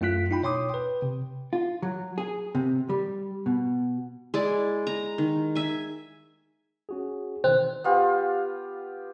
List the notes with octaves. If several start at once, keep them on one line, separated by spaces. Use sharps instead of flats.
F#2 A3 E4 F4 F#6 B6
D#4 F4 G5 B5
B2 C#5 G5 C6 D6 D#6
B4 G5
C3
F4
F#3
G#4
C3
G3
B2
G#3 E4 D5
A#5
D#3
E5 G#5
C#4 F#4 G#4
B2 D#3 C4 C5
B3 F4 G4